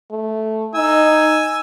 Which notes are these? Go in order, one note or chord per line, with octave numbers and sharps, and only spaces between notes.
A3
D#4 G#5 E6